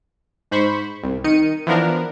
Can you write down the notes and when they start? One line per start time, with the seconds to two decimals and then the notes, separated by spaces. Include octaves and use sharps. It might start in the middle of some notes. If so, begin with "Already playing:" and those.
0.52 G#2 C5 B5 C#6
1.04 C2
1.24 D#3 D#4 C#7 D#7
1.67 E3 F3 B3 D4 A#4